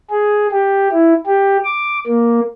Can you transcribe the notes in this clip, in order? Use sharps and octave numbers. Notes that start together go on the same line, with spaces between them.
G#4
G4
E4
G4
D6
A#3